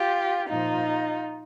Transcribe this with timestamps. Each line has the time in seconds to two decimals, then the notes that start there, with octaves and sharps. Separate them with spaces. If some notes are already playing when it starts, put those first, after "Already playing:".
Already playing: F4 G4
0.48 A#2 F3 D#4 F4